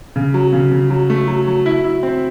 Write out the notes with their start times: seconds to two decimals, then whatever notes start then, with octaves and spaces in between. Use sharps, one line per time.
0.16 C#3
0.34 F#3
0.53 C#3
0.71 C#3
0.90 F#3
1.10 A3
1.28 F#3
1.47 F#3
1.66 E4
1.84 E4
2.03 C4